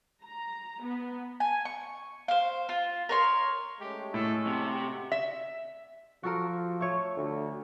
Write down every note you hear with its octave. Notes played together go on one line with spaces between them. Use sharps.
A#5
B3
G#5
C#6
C5 F5
F4
A#4 C#5 C6
G#3 A3 C#4 G4
A2 A4
C3 F#4
E5
F3 F#4 A4 A#4
A3 C#5
D2